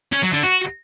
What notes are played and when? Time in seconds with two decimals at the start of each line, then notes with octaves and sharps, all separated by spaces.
0.12 C#4
0.22 F#3
0.33 D3
0.43 F#4